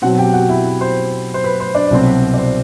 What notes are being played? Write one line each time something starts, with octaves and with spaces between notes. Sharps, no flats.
B2 F#3 C4 F#4 F#5
G4 G5
F#4 F#5
E4 E5
C5
C5
B4
C5
D4 D5
C2 B2 F#3 C4
D5
C5